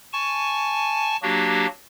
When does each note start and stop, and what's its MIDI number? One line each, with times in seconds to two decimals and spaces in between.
0.13 1.17 80
0.13 1.17 81
0.13 1.17 85
1.23 1.67 54
1.23 1.67 58
1.23 1.67 62
1.23 1.67 66
1.23 1.67 67